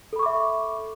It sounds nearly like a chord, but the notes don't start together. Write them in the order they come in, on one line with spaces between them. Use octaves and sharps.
A4 B5 C#6 D6 E5